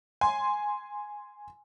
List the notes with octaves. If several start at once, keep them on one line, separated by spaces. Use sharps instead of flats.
G#5 C6